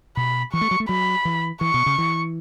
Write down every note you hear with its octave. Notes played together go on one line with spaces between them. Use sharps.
B2 B5
E3 C#6
A3
F#3
A3
F#3 B5
E3
E3 C#6
B2
C#3
E3